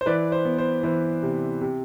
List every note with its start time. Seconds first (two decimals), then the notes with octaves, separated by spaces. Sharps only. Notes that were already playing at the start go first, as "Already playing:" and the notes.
0.01 C5
0.06 E3 B4 D5
0.32 C5
0.45 B3
0.58 C5
0.83 E3 C5
1.23 C3
1.61 C3